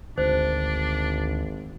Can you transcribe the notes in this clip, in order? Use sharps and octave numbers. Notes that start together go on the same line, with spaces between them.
G#1 D2 D4 C5